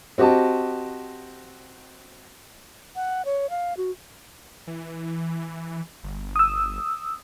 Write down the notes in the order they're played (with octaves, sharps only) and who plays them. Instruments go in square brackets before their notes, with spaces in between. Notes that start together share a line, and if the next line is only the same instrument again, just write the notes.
[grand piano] C4 F#4 G4 D#5 A5
[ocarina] F#5
C#5
F5
F#4
[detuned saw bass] E3
G1
[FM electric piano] D#6 E6